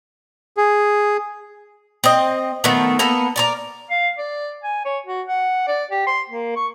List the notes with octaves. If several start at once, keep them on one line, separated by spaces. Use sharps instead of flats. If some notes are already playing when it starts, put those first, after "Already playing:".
G#4
C4 D#5
D#3 F3 A3 B3
A#3 B3 A4
A#4 C#5 D5
F5
D5
G#5
C#5
F#4
F#5
D5
G4
C6
A#3
C#6